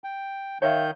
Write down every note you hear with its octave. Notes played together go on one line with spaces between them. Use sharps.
G5
D#3 C#5 E5 F5 G6